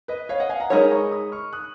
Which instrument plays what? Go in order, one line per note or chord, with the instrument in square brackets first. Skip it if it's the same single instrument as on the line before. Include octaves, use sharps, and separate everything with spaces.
[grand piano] B4 D#5
C#5 F5
D#5 F#5
F5 G#5
F#5 A#5
[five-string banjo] G#3 D#4 A#4 C#5 [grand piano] G#5 B5
[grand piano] A#5 C#6
B5 D#6
C#6 F6
D#6 F#6